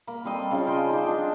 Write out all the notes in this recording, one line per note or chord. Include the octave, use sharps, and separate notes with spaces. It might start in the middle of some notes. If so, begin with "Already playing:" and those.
A#3 B5
G3 C4 A4 D#5
C#3 F3 F4
C5 D#5 G5 G#5
D#4 G4
F3 D4 D#4